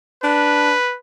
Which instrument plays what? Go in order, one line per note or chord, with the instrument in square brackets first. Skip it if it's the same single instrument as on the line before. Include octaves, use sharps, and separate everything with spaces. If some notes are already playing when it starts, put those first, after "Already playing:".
[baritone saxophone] D4 [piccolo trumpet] B4